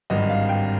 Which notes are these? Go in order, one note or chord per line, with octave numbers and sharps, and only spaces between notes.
G#1 G2 D3 G3 D#5
F5
G5